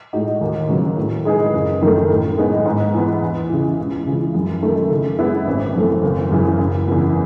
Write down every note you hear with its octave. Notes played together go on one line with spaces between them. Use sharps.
A2 G#3 D#4 F#4
D#2
C#3 F#3 B3
A2
G#3 D#4 G#4 B4
F#1
F#2 D#3 A3
A2
G#3 B3 D#4
G#2
E3 B3
E2
C#3 E3
C#2
C#3 E3
F#2
D#3 A3 E4 A4
C#3
G#3 B3 E4
G#1
F#2 E3 A3
F#1
F#2 C#3 E3
F#1
E2 C#3 E3 B3